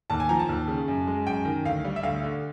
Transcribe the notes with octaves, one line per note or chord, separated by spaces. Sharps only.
D#2 A5
G#5
F3 A#5
A5
D#2
C#3
F#2
G#3
F#2 G5
D#3
D2 F5
G3
E5
D2 F5
D3